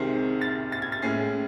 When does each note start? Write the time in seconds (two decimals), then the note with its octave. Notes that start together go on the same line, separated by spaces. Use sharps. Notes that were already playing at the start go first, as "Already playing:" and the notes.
Already playing: C2 C3 D#3 G#3 C4 C7
0.41 A6
0.72 A6
0.82 G#6
0.92 A6
1.02 A2 G#3 C#4 C7